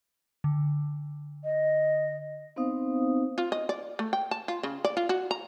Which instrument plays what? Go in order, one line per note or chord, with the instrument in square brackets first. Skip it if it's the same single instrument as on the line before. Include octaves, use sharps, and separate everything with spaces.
[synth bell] D3
[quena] D#5
[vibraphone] B3 C4 D#4 C5 F5 D#6
[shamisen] F4
D#5
D5
A3
G5
A5
F4
C#3
D5
F4
F#4
A#5